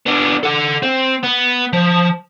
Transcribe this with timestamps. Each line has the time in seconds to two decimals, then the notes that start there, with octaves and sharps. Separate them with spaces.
0.06 B3 D4
0.43 A4 F#5
0.82 C4
1.23 B3
1.73 F3